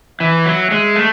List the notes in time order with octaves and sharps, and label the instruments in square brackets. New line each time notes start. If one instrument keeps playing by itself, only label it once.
[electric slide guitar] E3 [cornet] E5
[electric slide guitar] F#3
G#3
A3